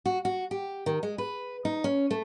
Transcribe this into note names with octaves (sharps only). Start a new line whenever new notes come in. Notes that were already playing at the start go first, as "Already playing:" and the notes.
F#4
F#4
G4
D#3
G#3
B4
D#4
C#4
A3